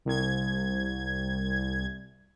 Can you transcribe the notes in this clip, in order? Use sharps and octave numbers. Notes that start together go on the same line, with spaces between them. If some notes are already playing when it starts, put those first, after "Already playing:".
C2 G#6